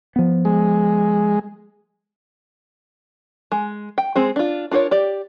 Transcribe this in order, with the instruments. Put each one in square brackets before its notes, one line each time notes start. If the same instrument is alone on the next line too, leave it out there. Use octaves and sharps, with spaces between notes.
[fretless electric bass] F3 B3
[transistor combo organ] G#3
[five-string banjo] G#3
G5
G#3 C4 G#4
D4 F4
D4 F4 A#4 B4 C#5
G4 D5